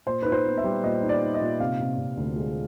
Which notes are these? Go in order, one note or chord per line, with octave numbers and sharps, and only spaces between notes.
A#2 C5
D#4 B4
C5
B3
E5
G3
A#2 D#5
D#4
D5
D#4
D#5
A#2
C3 F5
C3
C3
D2
G#3